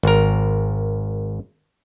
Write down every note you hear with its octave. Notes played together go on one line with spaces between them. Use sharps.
G#1 A#4